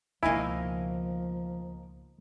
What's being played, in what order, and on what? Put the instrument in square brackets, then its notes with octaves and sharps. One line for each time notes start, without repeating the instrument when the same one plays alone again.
[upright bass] C#2 B2 [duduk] F3 [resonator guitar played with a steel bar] A#3 D#4 G#5 [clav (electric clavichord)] E4